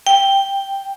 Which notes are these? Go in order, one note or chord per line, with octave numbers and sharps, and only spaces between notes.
G5